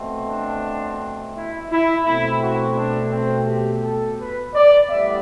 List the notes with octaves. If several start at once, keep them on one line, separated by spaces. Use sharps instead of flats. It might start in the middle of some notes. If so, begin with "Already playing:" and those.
Already playing: B2 A3 C4
D4
E4
E4
B2 A3 C4 E4
F#4
D4
C4
G4
A4
B4
D5
A2 G3 B3 E5